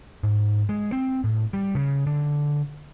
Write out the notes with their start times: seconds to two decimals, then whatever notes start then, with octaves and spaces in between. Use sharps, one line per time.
0.23 G#2
0.69 G#3
0.92 C4
1.24 A2
1.53 G3
1.75 C#3
2.07 D3